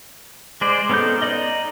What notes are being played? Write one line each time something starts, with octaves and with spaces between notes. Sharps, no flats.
G#3 C5 D5
B3 C#4 D#4 A4 G6
D#4 D5 D#5